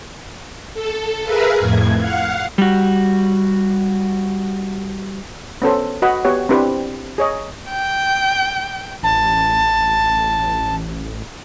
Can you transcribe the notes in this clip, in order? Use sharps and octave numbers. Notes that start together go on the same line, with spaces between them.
A4
G#4 A#4 B4 E5 F5
F2 A2 G#6
F5 F#5
G3 F#4
B3 C#4 A4 C5
F#4 B4 D#5 F#5 B5
B3 F#4 G4 C#5 F#5
C4 D4 E4 G4 B4 C5
G#4 C#5 D#5
G5
A1 A5